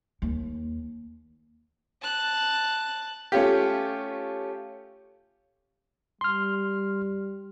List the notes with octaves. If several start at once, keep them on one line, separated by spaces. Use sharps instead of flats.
D#2
A5 F#6
A3 C#4 F4 G4
G3 C6 F6